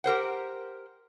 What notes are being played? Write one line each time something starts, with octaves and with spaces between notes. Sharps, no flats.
G4 A#4 C5 F#5